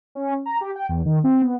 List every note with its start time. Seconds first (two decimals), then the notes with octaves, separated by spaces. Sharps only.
0.15 C#4
0.46 A#5
0.61 G4
0.75 G5
0.89 E2
1.06 D#3
1.24 C4
1.42 B3